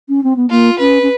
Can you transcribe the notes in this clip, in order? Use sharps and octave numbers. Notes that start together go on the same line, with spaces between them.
C#4
C4
B3
A#3 F4
C#4 B4
C#4